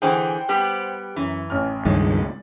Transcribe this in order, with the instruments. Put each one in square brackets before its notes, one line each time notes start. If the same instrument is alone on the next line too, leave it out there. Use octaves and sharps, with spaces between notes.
[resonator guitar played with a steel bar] D3 E3 G#4 [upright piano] C5 F#5 G5
[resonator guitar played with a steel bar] G3 B3 G4
[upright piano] F#2 [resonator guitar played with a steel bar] E3
[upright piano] A1 F6
[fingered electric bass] C#2 G2 D#3 [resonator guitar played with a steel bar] G#3 [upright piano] D5